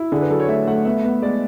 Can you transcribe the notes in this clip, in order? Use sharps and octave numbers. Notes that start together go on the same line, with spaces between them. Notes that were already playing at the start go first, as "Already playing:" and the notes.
Already playing: E4
D3 G#4
B4
F#3 A4
C#5
A3 E5
A3 F#5
B3 E5
B3
G#3 D5